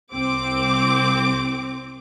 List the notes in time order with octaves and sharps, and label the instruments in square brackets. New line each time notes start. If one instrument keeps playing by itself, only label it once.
[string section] C2 C4 D6